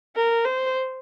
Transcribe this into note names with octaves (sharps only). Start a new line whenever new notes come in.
A#4
C5